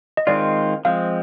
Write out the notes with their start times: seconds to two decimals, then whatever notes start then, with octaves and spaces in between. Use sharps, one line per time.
0.17 D#5
0.27 D#3 G#3 C4 F4 D5
0.85 F3 G#3 C4 F5